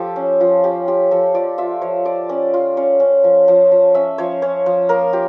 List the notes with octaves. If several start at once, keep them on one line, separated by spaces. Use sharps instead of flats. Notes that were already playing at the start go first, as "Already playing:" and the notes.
Already playing: F3 G4 A4
C#4
F3 F4
C#4 G4
F4 G4
F3 A4
F4 D5
F4 E5
F3 C#5
F4 D5
C#4 D5
F4
C#4 C#5
C#4
F3
F3
F3
C#4 E5
F3 C#5
C#4 C#5
F3
A#3 A#4
F4 G4